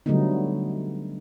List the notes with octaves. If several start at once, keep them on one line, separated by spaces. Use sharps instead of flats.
D3 F#3 G3 A3 B3 D#4